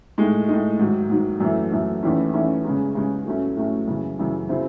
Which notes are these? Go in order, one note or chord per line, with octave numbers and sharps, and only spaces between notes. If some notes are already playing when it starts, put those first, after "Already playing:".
A2 G#3 D#4
A2 G#3 D#4
G#2 D#3 F#3
G#2 D#3 F#3
F#2 E3 A3
F#2 E3 A3
E2 D#3 A3 C#4 E4
E2 D#3 A3 C#4 E4
C#3 G#3 C#4
C#3 G#3 C#4
A2 F#3 A3 C#4
A2 F#3 A3 C#4
F#2 C#3 E3
F#2 C#3 E3
C#3 F#3 C4 E4